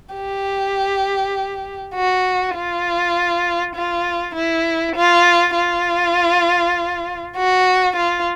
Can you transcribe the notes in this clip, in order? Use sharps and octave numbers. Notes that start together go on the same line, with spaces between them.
G4
F#4
F4
F4
E4
F4
F4
F#4
F4